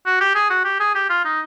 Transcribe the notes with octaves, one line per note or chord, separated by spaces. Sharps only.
F#4
G4
G#4
F#4
G4
G#4
G4
F4
D#4